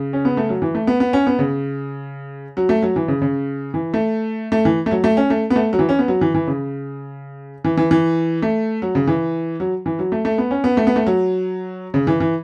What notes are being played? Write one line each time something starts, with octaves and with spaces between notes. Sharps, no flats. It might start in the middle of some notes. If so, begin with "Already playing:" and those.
Already playing: C#3
C#4
B3
A3
F#3
E3
A3
B3
B3
C#4
B3
C#3
F#3
A3
F#3
E3
C#3
C#3
E3
A3
A3
E3
A3
F#3
A3
C#4
A3
B3
A3
F#3
E3
C#4
B3
F#3
E3
E3
C#3
E3
E3
E3
A3
F#3
C#3
E3
F#3
E3
F#3
A3
A3
B3
C#4
B3
A3
B3
A3
F#3
C#3
E3
E3